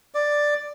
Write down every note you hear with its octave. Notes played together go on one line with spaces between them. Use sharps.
D5